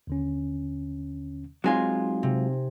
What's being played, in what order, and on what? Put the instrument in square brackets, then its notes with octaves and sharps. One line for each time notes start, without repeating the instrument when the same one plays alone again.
[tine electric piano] D#2 D3 C#4
[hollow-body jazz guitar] F#3 G#3 F4 [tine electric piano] C4 C6 [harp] D#4 G#5
[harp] C3